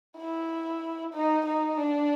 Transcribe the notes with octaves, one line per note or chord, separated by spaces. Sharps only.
E4
D#4
D#4
D4